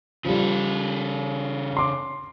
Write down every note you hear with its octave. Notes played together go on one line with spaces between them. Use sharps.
C#3 F3 G3 A4
C6 D6